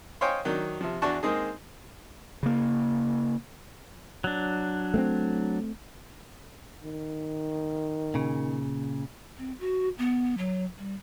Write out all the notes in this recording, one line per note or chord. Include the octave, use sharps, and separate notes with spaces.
C5 C#5 D#5 F5 G5 G#5
D#3 F#3 D4
C3 F3
E2 D4 F#4 A5 C#6
G#3 A#3 C4 D#4 G#4
C#3 A#3
F#3 D4
A3 B3 C4
D#3
A#2 C#3
C4
F#4
B3
F#3
G3